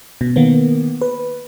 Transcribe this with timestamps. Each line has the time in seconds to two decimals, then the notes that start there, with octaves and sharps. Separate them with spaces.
0.21 B2
0.36 D#3 A#3 B3
1.01 B4